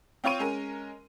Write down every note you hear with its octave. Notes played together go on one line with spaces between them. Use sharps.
C4 F4 C#5 C#6 D#7
G#3 C#4 A#4